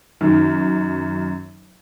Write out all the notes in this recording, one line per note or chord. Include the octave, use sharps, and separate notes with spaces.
F#2 D#3